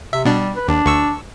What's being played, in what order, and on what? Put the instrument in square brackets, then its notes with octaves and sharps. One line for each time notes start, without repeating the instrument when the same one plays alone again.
[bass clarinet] C3 [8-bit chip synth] E5
[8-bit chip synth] B2 D4 [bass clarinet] G3
[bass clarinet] B4
[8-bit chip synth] D#2 [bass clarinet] D4
[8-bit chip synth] D2 C#6 E6